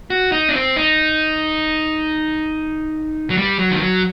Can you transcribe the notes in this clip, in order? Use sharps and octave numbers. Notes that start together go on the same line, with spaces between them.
F#4
D#4
D4
C4
D#4
F#3
G3
F#3
D#3
F#3